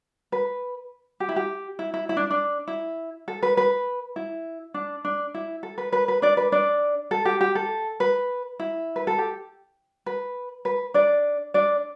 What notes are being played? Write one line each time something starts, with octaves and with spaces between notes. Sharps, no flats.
B4
G4
E4
G4
E4
E4
E4
D4
D4
E4
A4
B4
B4
E4
D4
D4
E4
A4
B4
B4
B4
D4 D5
B4
D4 D5
A4
G4
G4
A4
B4
E4
B4
A4
G4
B4
B4
D4 D5
D4 D5